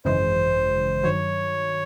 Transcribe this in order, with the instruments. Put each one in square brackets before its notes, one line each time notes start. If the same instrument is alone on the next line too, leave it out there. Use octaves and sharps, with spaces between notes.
[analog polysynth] G#1 F#2 C#3 E3 G#3 [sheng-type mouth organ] C5
[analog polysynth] G2 D#3 F#3 [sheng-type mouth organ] C#5